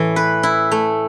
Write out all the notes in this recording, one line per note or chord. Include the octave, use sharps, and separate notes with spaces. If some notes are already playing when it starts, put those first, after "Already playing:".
Already playing: A2 E3
B4
E4
A3